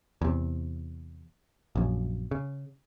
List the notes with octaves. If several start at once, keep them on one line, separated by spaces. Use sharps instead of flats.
E2 C3
A#1 F#2
C#3